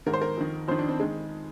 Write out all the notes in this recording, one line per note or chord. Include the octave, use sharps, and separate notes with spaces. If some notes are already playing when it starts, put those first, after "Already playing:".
G#2 D#3 A#4
C5
A#4
F2 D#3
F2 D#3 C5
D4
C4
D#3 G#3